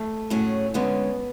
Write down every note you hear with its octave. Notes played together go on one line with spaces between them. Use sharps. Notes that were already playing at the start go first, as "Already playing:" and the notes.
Already playing: A3
A2 F#3 C#4 G#4
D3 G#3 B3 C#4